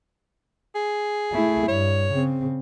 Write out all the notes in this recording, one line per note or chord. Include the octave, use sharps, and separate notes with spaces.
G#4
A3 E4
G2 C#5
C#3 C4